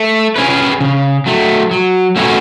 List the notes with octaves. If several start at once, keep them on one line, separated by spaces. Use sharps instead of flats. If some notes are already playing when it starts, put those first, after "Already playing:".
Already playing: A3
C#4 G#4 B4
C#3
F#3 A3
F#3
A3 C#4 F#4 B4